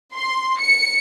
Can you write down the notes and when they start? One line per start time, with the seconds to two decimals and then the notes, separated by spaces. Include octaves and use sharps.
0.15 C6
0.59 C#7